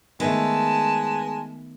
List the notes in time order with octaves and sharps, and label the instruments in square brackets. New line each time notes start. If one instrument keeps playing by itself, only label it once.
[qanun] D#3 A3 [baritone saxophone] G#3 [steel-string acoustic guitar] B3 [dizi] A5